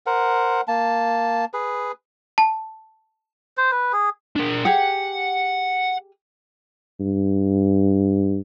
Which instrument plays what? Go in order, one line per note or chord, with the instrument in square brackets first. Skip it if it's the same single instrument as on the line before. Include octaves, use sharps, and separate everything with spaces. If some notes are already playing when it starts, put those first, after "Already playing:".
[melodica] A#4 C5 F#5
A#3 A5
G#4 B4
[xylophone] A5
[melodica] C5
B4
G#4
[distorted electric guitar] D4 A#4
[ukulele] G4 G#4 [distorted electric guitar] F#5
[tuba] G2